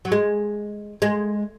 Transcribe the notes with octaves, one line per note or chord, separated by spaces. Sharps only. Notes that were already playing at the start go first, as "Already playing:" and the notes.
F#3
G#3
G#3